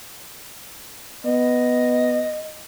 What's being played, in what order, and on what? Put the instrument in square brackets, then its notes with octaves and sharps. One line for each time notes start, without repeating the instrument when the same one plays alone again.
[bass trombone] B3 [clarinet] D#5